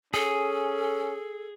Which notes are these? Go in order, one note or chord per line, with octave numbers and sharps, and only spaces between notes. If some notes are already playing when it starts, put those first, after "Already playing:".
C#4 G#4 A4